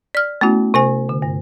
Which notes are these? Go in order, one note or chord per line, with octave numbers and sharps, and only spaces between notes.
D5 F6
A3 B3 C#4 E4 F#4
C3 C5 G#5
D3
G2